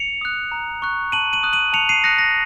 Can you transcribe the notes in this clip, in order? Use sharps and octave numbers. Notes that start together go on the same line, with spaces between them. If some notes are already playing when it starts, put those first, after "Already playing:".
Already playing: C#7 F7
D#6 F#6
A#5
C#6 F#6
A5 D#7 F#7
D#7 F#7
D#6 F#6
D#7 F#7
A5 C#7 F7
C7 D#7
D#6 F#6 A#6 C#7
A#6